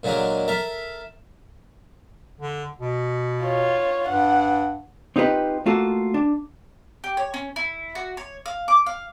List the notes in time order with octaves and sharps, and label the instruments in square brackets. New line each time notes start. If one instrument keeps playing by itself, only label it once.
[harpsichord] A#2 D3 F#3 G#3 A#3
A4 A#4 E5
[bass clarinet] D3
B2
[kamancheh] F4 C#5
[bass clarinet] G2 [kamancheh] F#5
[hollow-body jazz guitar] C4 D#4 F4 G4 B4
A3 A#3 F4 F#4 A4
D4
[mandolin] G4
C#5
C#4
E4
F#4
C#5
F5
D6
F5